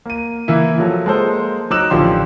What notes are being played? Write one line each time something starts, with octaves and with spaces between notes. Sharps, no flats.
A#3 D#7
E3 A#3 E4
F3 F#3 A4
G#3 A#3 A4 C5
F#3 D#4 D6 E6 F#6 E7
A1 D3 F3 G4 C6